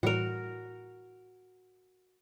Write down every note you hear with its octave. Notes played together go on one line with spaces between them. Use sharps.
A2 E3 G3 F#4 A#4